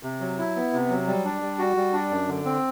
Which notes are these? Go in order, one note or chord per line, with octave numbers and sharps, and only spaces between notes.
C3
F#3
E4
B3
C3
F#3
G3
D4
G3
F#4
G3
D4
F#2
D3
C4